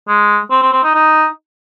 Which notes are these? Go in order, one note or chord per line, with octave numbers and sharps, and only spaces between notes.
G#3
C4
C4
C4
D#4
D#4